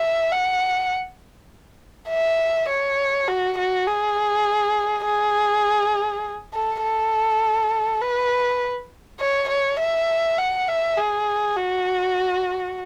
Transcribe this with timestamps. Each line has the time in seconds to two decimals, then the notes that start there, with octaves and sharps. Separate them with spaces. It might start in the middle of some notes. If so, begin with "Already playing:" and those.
Already playing: E5
0.32 F#5
2.10 E5
2.69 C#5
3.28 F#4
3.58 F#4
3.87 G#4
5.05 G#4
6.53 A4
6.83 A4
8.02 B4
9.20 C#5
9.49 C#5
9.79 E5
10.39 F#5
10.68 E5
10.98 G#4
11.57 F#4